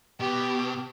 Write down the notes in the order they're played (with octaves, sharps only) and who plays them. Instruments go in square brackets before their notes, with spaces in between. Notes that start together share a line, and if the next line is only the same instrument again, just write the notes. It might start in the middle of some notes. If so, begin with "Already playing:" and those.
[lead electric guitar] B2 [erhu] G4